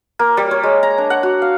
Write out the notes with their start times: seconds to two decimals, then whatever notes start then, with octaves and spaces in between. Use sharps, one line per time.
0.19 A#3
0.37 G3
0.51 C#5
0.63 G#3
0.83 A#5
0.98 D4
1.10 F#5
1.23 F#4
1.42 F5